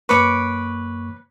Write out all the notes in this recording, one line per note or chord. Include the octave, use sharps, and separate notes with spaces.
F#2 A#3 B4 C#5 C#6 D6